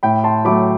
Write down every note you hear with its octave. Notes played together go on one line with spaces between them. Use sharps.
A2 G5 B5
A5 C6
F#3 A3 B5 D6